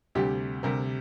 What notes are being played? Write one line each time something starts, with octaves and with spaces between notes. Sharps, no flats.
D2 C3 G3 G4
D2 C3 G3 A#4